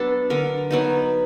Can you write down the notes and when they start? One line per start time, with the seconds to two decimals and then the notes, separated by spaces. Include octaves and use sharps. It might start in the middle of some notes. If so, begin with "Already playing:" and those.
Already playing: F#3 B3 D4 A4
0.30 D3 A#4
0.71 F#3 B3 D#4